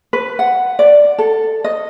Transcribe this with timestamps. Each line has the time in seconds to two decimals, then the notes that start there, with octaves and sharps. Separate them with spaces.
0.13 B4
0.39 F#5
0.79 D5
1.18 A4
1.64 D#5